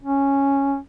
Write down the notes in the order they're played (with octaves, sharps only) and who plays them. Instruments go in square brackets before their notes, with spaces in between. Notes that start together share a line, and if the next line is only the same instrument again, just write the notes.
[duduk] C#4